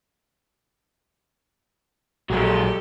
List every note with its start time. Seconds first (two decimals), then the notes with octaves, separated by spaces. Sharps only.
2.30 A#1 F#3 G#3 G4 A4